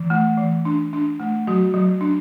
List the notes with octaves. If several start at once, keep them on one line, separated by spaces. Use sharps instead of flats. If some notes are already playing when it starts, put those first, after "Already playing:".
Already playing: E3
A3
E3
D4
D4
A3
F#3 F#4
F#3
D4